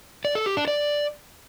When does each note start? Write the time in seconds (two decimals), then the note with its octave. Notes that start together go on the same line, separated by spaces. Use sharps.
0.25 D5
0.35 A4
0.46 G4
0.57 D4
0.68 D5